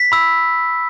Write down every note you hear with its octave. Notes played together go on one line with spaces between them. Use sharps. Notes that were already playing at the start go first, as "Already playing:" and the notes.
Already playing: B6
B5 E6